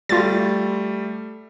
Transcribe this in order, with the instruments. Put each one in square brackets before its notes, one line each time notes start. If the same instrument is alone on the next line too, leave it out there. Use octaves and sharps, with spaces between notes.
[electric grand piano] G3 A3 [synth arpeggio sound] F4 A6